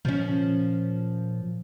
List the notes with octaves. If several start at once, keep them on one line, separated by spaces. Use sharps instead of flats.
A#2 F3 C#4